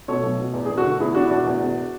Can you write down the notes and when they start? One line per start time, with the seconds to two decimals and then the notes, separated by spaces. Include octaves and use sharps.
0.08 B2 A4 C#5
0.23 B1
0.39 B2
0.54 E2
0.65 E1 G#4
0.77 F#4 A4
0.85 D3
1.00 E2 E4 G#4
1.15 E2 D4 F#4
1.24 E4
1.30 E1 D4 F#4
1.46 E2
1.62 E1